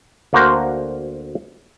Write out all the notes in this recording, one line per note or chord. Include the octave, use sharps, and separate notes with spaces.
D2 A#3 F#4 A#4 C5 A#5